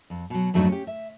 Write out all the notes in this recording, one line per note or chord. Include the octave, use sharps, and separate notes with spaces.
F2
B2 F#3
F2 G#2 F#3 A3 D4 D#4
C#4 G4
E5